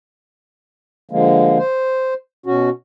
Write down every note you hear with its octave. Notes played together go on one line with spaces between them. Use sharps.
D3 F3 G#3 A#3
C5
B2 C#4 F#4